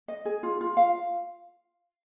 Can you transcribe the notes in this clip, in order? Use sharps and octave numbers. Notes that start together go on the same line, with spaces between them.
D#5
G#4
F4
F4
F5